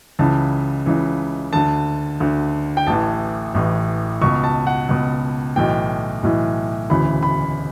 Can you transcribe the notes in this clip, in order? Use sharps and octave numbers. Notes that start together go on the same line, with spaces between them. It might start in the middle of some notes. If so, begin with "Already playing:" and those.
C#2 C#3 E3 A5
C#2 C#3 E3
D2 D3 A5
D2 D3
G5
A1 A2 E3 A5
A1 A2 E3
C#2 B2 C#6
A5
F#5
C#2 B2
B1 A2 E3 G5
B1 A2 E3
E1 D2 C#3 E3 B5
B5